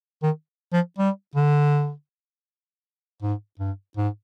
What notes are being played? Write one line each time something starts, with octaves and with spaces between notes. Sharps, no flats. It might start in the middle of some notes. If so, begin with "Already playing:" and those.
D#3
F3
G3
D3
G#2
G2
G#2